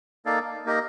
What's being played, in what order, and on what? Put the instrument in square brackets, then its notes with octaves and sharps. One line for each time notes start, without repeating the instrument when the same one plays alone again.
[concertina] A#3 D#4 A4 D5 F5
A#3 D#4 G4 A#4 D#5